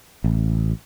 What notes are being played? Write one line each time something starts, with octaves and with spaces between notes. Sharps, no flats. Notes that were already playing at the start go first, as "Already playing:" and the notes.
A1